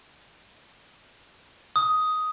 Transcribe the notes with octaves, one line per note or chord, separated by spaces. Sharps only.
D#6